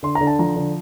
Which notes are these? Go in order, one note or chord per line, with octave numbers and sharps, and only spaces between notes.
D3 C6
A#5
D3
A5
F3 A#5
D3